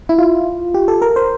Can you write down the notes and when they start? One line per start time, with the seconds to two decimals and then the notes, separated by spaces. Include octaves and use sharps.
0.09 E4
0.18 F4
0.74 G4
0.88 A4
1.02 A#4
1.16 C5